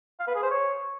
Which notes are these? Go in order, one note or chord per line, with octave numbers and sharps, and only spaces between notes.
F5
B4
G#4
C5
C#5